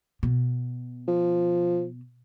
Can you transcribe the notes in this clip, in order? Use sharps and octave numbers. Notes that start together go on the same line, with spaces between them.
B2
F3